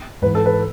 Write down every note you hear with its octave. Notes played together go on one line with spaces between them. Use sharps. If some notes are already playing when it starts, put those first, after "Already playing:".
G#2 E3 B4
A4
B4